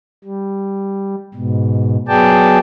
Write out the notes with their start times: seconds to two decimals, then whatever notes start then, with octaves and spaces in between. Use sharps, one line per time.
0.24 G3
1.34 G#2 B2
2.08 F#3 B3 G#4 D5 G5 A5